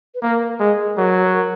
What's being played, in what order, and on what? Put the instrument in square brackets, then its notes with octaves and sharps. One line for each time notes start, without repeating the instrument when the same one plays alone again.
[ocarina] B4
[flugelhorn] A#3 [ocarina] A#4
[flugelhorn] G#3 [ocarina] G#4
[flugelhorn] F#3 [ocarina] A#4
[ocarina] A#4